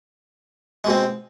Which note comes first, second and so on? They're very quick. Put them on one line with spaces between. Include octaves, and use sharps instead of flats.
G#3 B2 C4